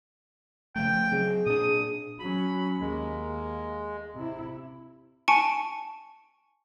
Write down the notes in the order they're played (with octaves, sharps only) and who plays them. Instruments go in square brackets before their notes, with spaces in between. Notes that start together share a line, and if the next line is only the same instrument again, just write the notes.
[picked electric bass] C#3 F3 A3 [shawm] G5
[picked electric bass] F#3 C4 [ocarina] G#4
[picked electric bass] A#2 D4 [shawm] D#6
[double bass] F#3 C#4 [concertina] B5
[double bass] D#2 A#3 [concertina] G#3
[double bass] C3 E4
[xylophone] G#5 A5 C#6 C#7 D7